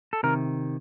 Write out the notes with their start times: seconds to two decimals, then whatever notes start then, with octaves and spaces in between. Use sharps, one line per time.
0.13 A4
0.23 C3 D#3 A#4